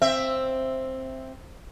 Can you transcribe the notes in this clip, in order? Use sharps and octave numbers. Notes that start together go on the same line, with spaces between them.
C4 E5